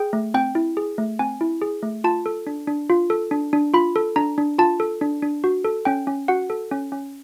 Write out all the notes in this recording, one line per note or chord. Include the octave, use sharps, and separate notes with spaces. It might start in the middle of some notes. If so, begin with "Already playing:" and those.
Already playing: G#4 G5
A3
C4 G5
E4
G#4
A3
C4 G#5
E4
G#4
A3
F4 A5
A4
D4
D4
F4
A4
D4
D4
F4 B5
A4
D4 A#5
D4
F4 A5
A4
D4
D4
F#4
A4
C#4 G5
C#4
F#4 F#5
A4
C#4
C#4